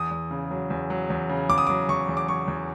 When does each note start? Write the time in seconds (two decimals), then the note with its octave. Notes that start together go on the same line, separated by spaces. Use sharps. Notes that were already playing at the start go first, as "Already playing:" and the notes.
Already playing: E2 D#6
0.11 E2
0.31 C#3
0.51 F#3
0.70 E2
0.90 F#3
1.10 E2
1.29 C#3
1.49 E2 D6
1.58 D#6
1.67 F#3 D6
1.89 E2 C#6
2.09 E2
2.17 D6
2.28 F#3 C#6
2.48 E2